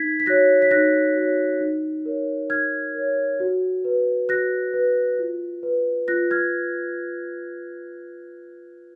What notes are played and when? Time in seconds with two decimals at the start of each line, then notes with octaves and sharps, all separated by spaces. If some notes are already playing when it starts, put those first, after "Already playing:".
Already playing: D#4 G#6 B6
0.20 B6
0.26 F#4 C#5 F#6 A#6
0.62 B6
0.71 D#4 F#6 A#6
1.17 F#4 C#5
1.61 D#4
2.06 A#4 C#5
2.50 D#4 F6 G#6
2.95 A#4 C#5
3.40 F#4
3.85 B4
4.29 F#4 F#6 A#6
4.74 B4
5.19 F4
5.63 B4
6.08 F4 F#6 A#6
6.31 F6 G#6